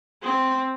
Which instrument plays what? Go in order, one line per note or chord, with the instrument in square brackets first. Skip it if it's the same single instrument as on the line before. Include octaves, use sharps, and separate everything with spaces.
[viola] C4